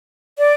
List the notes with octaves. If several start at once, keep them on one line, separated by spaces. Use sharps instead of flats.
D5